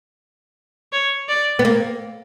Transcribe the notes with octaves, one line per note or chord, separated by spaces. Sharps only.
C#5
D5
B3
A#3